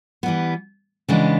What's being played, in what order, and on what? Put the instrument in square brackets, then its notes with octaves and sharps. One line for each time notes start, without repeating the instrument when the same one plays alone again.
[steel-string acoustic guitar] E3 G3 B3
C#3 E3 G#3 B3 D4